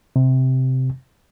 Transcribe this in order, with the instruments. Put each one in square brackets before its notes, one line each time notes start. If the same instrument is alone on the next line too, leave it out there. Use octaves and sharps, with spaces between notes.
[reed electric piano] C3